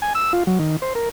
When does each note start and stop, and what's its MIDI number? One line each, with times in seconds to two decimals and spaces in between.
0.02 0.13 80
0.15 0.33 88
0.33 0.43 65
0.47 0.59 54
0.59 0.76 51
0.82 0.93 72
0.95 1.09 70